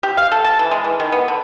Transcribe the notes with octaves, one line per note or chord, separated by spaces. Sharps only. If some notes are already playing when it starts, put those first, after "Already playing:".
G4
F5
A4
A5
E3
G#3
E3
D#3
B3
D3